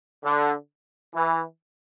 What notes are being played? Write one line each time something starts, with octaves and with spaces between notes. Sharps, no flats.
D3
E3